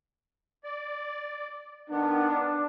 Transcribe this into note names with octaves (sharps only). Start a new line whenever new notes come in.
D5
D#3 B3 D4